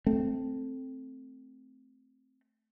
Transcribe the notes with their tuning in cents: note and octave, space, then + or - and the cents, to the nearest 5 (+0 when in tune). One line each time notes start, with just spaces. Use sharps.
A3 +0 C4 +0